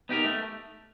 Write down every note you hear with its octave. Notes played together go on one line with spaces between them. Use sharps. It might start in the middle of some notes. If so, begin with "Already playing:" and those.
B3 D#4 G4 A#4
A3